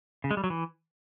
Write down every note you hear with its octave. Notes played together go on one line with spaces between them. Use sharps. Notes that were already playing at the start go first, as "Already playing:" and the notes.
C#3
G#3
G3
F#3
E3